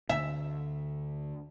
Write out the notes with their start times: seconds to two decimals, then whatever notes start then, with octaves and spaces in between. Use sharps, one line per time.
0.09 D2 D3 E5